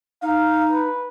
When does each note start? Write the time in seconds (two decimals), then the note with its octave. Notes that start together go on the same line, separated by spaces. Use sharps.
0.22 D#4 F5
0.71 B4